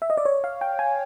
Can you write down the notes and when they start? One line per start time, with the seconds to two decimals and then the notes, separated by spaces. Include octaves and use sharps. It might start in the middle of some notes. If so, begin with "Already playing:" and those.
0.02 E5
0.10 D#5
0.17 D5
0.25 C#5
0.44 F5
0.61 G5
0.79 G#5